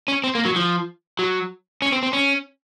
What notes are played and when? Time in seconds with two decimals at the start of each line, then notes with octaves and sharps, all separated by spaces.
0.08 C#4
0.24 C4
0.35 A#3
0.45 F#3
0.56 F3
1.19 F#3
1.82 C#4
1.92 C4
2.03 C4
2.13 C#4